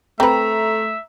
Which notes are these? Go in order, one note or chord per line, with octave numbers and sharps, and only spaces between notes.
A3 C4 B4 E5 A#5